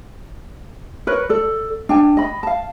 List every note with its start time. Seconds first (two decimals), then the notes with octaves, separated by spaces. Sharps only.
1.07 A#4 B4 C#5
1.29 A4 D5
1.89 D4 G5 G#5
2.17 D#5 B5
2.43 F5 A5